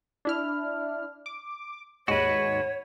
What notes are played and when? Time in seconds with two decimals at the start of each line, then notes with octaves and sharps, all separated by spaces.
0.25 D4 E4 F6
1.26 D6
2.08 D#2 G#2 G#3 F#4 B4 C#5